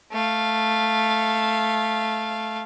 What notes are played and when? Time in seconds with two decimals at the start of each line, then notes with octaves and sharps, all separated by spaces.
0.12 A3 F5